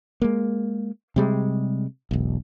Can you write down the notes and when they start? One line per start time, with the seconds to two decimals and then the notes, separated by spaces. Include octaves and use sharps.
0.22 G#3 A#3
1.16 C3 G3 G#3
2.11 E1 B1